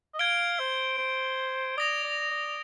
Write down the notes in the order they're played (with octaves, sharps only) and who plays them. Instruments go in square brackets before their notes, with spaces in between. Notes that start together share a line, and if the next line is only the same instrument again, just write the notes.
[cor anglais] D#5
[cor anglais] F5 [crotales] G#6 D7 G7
[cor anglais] C5
C5
[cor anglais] D5 [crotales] D#6 A#6 F7
[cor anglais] D5
D5